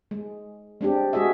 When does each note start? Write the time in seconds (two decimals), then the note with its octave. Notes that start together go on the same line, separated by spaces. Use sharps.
0.11 G#3
0.81 G#3 C4 D4 G4
1.13 G#3 F#4 G#4 D#5 E5